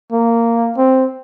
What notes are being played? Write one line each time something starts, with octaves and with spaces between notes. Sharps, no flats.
A#3
C4